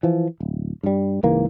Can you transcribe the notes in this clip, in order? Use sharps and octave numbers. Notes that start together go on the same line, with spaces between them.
E3 F3
D1
G2 G3
C#2 G#2 E3 A#3